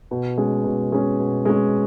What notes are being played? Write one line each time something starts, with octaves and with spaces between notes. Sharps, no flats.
B2
G#3 C#4
B2
G#3 C#4
B2
G#3 C#4